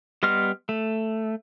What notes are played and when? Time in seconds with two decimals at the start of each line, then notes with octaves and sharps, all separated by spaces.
0.23 G3 B3 D#5 C6 F6
0.69 A3